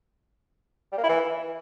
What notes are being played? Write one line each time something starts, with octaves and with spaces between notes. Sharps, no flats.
G3
A#3
E4
E3